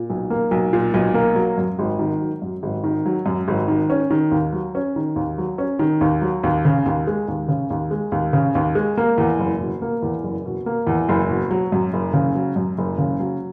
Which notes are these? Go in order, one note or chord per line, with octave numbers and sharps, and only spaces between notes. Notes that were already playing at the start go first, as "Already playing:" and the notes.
Already playing: A#2
B1
A#3
B1
A#2
B1
A#3
F#3
F#2
G#1
D#3
F#3
F#2
G#1
D#3
F#3
F#2
G#1
D#3
C#4
D#3
D#2
F#3
C#4
D#3
D#2
F#3
C#4
D#3
D#2
F#3
D#2
C#3
D#2
G#3
D#2
C#3
D#2
G#3
D#2
C#3
D#2
G#3
A#3
E2
F#1
B2
A#3
E2
F#1
B2
A#3
E2
F#1
B2
F#3
F#2
F#1
C#3
F#3
F#2
F#1
C#3
F#3